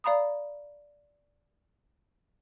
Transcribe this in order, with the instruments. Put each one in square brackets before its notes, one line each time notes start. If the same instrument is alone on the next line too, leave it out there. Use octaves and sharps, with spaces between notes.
[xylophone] D5 F5 A#5 B5 D#6